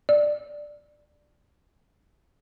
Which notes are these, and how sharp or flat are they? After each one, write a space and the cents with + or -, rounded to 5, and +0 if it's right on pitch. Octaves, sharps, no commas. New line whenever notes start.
D5 +10